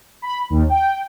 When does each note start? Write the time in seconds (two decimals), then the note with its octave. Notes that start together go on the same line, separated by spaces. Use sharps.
0.22 B5
0.50 D#2
0.69 G5